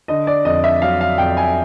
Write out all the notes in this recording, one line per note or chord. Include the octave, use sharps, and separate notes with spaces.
D3 D#5
D5
F2 D#5
E5
F#3 F5
F5
F2 G5
G#5